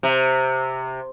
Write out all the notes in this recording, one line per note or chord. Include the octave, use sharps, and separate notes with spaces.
C3